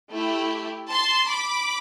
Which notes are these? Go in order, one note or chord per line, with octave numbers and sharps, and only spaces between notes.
A3 E4 G4
A5 C6
B5 D6